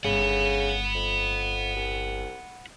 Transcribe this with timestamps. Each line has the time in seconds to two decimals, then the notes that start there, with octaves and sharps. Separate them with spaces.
0.04 G1 C#3 F#5 B5
0.95 F2
1.76 C2